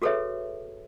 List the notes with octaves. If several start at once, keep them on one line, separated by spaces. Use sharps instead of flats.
F#4 G#4 A4 B4 C#5 E5